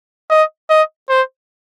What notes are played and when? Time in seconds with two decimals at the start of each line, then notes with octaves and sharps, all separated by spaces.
0.30 D#5
0.70 D#5
1.10 C5